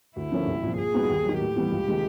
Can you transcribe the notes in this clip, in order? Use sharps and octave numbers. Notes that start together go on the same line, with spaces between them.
D2 E4
D3 F3 A#3 C#4
C2
A#2 F3
A#2 G#4
G3 B3 D#4 F#4
D#2
D#3 F#3
A2 G4
E3 G3 B3
C#2
C3 D#3 G#3